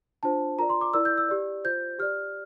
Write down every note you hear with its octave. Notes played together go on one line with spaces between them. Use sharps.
D4 F4 C5 A5
F4 A#4 D5 A#5
C6
D6
E4 A#4 D5 E6
G6
E6
G4 D5
F4 C5 G6
G4 D5 F6